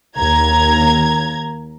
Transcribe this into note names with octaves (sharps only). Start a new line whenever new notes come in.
D#2 A#5 G#6